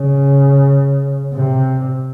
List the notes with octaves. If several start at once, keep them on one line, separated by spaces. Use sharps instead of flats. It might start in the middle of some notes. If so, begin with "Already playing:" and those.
Already playing: C#3
C3